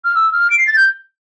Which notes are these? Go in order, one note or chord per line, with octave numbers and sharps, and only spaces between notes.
F6
E6
F6
D7
C7
A6
G6